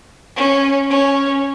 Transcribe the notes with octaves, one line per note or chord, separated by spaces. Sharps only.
C#4
C#4